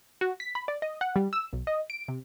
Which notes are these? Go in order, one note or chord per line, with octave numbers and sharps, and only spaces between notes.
F#4
B6
B5
D5
D#5
F#5
G3
E6
B1
D#5
D7
C3